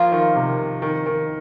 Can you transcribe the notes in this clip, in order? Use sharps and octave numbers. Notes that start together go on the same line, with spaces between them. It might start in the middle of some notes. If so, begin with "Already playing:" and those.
Already playing: F3 A#3 F4 A#4
D#3
C3
D#3
D#3